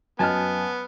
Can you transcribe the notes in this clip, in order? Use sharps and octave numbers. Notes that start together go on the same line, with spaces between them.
F#2 B3 D#5 G#5 A5 F6